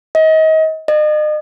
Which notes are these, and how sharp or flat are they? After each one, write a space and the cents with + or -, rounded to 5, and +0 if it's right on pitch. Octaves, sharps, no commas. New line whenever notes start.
D#5 +30
D#5 -40